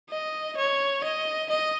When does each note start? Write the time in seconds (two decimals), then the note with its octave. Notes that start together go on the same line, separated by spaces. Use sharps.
0.10 D#5
0.57 C#5
1.04 D#5
1.49 D#5